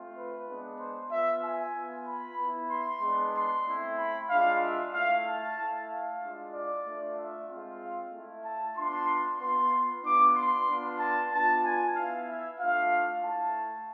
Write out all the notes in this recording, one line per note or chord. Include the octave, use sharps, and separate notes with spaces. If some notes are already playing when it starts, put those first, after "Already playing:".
Already playing: A3 C4 F4
B4
G#3 B3 D4
C5
B3 F4 E5
G#5
B3 F4
B5
B3 E4
C6
G#3 B3 D4
C6
A3 C4 E4
B5
G#3 D4 F4 F5
E5
A3 E4 F5
A5
A3 E4
F5
G#3 D4 F4
D5
A3 D4 F4
E5
G#3 C4 F4
F5
A3 E4
A5
B3 D4 F4 C6
B3 F4 C6
B3 D4 F4 D6
C6
B3 D4 F4
A5
B3 D4 F4 A5
G#5
B3 E4 F5
E5
A3 D4 F4 F5
A3 E4 A5